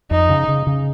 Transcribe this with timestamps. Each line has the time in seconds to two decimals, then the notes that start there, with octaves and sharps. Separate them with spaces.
0.11 F2 D#4
0.30 C#3
0.49 C#3
0.67 C#3